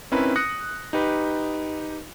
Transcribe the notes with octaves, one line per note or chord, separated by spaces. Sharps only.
C4 C#4 D#4 E4 A#4 B4
D#6 F#6 A#6 C#7
D#4 G4 B4